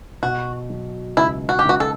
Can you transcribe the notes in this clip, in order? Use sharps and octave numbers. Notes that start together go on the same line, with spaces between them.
B2 F#4
F#3
C#2 E4
F#4
G4
C#2 F#4
A4